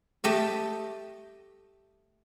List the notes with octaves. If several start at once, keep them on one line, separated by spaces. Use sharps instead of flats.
A3 G4 D#5